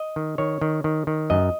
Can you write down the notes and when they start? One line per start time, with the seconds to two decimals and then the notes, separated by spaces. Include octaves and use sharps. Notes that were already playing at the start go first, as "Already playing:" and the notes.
Already playing: D#5
0.16 D#3
0.38 D#3 C#5
0.61 D#3
0.84 D#3
1.07 D#3
1.30 F#2 D#5